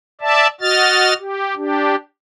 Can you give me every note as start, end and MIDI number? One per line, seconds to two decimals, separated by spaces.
0.21 0.47 74
0.21 0.47 76
0.21 0.47 81
0.61 1.13 66
0.61 1.13 75
0.61 1.13 89
0.61 1.13 93
1.19 1.56 67
1.56 1.95 62
1.56 1.95 67